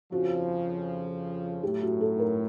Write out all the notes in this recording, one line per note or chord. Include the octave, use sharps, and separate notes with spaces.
F2 C#3 F3 F#4
A2 F#3 A3 G4
F#4
A4
A#4